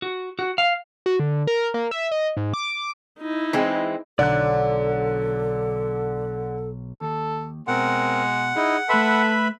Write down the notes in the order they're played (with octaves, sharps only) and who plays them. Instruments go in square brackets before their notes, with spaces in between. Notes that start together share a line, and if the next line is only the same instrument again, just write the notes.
[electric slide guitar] F#4
F#4
F5
[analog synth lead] F#4
D3
A#4
A#3
E5
D#5
G#2
D6
[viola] D#4 E4
[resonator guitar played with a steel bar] E3 G#3 C4
[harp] B1 [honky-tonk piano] D3 [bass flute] A4 [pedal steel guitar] D5 F#6
[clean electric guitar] D#2 [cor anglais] A4
[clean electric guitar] B2 [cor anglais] G#3 [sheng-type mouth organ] C4 A#4 [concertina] F#5
[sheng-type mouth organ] D#4 E4 [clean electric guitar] G#4
[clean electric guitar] A3 C6 [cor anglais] A4 [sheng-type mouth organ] B4 E5 B5